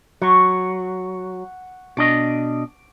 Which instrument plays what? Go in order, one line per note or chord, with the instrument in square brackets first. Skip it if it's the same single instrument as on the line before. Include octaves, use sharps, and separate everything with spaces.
[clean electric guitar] F#3 [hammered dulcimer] F#5 C#6
[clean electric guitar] B2 D4 D#5 [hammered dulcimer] D6